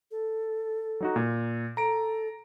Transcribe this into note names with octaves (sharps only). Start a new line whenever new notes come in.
A4
F#3 D#4 F#4
A#2
A4 A#5 D7